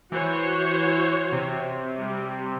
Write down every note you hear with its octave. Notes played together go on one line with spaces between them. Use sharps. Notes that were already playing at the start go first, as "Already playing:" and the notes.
E3 F#4 C5 C#5
C3
G3